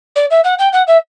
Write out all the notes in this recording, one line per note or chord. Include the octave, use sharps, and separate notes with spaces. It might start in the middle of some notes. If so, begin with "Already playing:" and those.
D5
E5
F#5
G5
F#5
E5